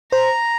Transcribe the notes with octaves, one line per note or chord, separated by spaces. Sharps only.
C5 A#5